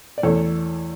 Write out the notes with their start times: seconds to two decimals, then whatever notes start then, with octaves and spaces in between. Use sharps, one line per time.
0.18 D5
0.23 E2 E3 A3 A4 C#5